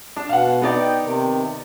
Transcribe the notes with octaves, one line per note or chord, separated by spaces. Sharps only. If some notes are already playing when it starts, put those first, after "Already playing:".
D4
B2 F5 F#5
B3 D#4 D5
G5
C3 D#3